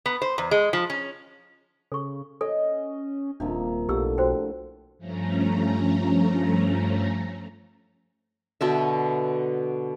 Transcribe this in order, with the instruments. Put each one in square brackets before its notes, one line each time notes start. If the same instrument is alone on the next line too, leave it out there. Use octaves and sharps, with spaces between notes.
[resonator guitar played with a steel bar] B3
C5
E2
G#3
F3
C#4
[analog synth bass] C#3 [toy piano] A4 C#6
[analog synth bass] C#4 [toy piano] A4 [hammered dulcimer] D#5
[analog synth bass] D#1 [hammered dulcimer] C3 F3 A#3 [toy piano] D4
[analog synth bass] B1 [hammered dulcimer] A2 D3 [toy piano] G4 E6
[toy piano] F#4 C5 G5
[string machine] G2 F3 A3 C#4 A#5
[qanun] B2 D3 E5